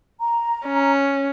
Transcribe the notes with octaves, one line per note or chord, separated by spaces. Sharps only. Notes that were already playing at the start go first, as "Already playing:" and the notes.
A#5
C#4